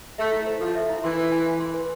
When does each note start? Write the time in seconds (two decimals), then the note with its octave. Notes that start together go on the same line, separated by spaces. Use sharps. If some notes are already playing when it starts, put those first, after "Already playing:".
0.18 A3 E5
0.32 E4
0.47 C5
0.60 F3 A4
0.75 E5
0.90 E4
1.04 E3 C6
1.18 B4
1.32 G#5
1.46 F5
1.60 C6
1.74 B4